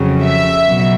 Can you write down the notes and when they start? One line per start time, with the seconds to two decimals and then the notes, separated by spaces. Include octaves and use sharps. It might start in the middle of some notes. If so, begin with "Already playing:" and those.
Already playing: F2 C#3 F#3
0.23 E5
0.66 B2 F#3